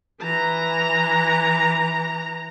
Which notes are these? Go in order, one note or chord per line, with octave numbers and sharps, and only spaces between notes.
E3 A#5